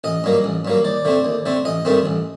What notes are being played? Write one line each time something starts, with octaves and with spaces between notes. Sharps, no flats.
A1 D#5
G2 F#3 A#3
A1
G2 F#3 A#3
D#2 D5
D3 A3 C4
D#2
D3 A3 C4
A1 D#5
G2 D#3 A3 C4
A1